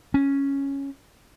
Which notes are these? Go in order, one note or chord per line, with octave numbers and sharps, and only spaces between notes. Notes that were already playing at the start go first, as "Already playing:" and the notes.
C#4